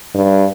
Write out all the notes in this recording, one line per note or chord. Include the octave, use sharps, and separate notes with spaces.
G2